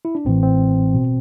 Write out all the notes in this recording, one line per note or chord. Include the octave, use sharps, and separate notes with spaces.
E4
D4
A1 A2 E3 C4
C4
B2